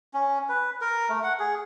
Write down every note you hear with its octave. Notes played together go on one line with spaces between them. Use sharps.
C#4
B4
A#4
A3
F#5
G#4